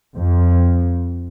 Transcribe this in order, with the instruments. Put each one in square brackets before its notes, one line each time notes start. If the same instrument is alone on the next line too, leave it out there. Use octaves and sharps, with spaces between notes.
[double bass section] F2